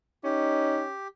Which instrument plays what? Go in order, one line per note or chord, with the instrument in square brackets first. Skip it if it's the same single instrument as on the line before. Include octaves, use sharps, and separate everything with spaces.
[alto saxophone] C#4 [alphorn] D#4 [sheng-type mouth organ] G4